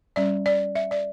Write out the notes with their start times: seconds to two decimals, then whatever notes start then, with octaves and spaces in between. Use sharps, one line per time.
0.16 G3 C#4 D5
0.46 D5
0.75 E5
0.91 D5